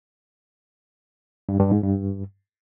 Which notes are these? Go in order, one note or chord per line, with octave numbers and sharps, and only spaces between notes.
G2
G2
G#2
G2